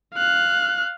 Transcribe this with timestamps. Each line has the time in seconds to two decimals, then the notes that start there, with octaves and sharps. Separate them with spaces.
0.14 F5 F#6